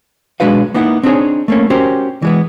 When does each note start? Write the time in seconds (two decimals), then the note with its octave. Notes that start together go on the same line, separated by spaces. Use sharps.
0.40 B1 G#3 D4 F#4 B4 F5
0.74 A#3 B3 D#4 E4 F#5
1.03 C4 D4 D#4 G#4 C#5 G#5
1.48 A3 A#3 C#4
1.70 C#4 F#4 G4 A#4 C5
2.22 E3 G#3 B3